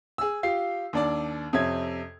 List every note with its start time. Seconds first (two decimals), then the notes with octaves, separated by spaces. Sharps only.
0.18 G#4 E6
0.43 F4 G4 C7
0.93 D#2 D4 D5
1.53 F2 C3 C#4 E5 G#6